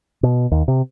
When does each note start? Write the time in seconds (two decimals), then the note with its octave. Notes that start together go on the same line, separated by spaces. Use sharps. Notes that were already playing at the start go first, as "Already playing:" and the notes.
0.23 B2
0.52 D#2
0.68 C3